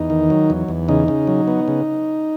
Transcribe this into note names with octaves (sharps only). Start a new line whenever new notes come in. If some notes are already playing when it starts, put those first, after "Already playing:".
Already playing: E2 D#4
D#3
F#3
E2
E2
C#3 D#4
C#3
F#3
B3
C#3